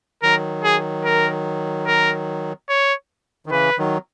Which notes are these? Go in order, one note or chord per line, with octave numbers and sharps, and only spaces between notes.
D#3 F#3 A#4
G#4
A#4
A#4
C#5
D#3
C#3 E3 B4
D#3 F#3